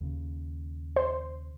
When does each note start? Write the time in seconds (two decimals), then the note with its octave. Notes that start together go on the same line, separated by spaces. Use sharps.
0.01 D#2 C#3
0.96 C5